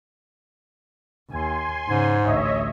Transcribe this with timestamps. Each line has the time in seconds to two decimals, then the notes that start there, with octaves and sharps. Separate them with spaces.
1.30 D#2 G#5 C6
1.88 G#2 C#3
2.24 A1 D2 C#5 D#5 E5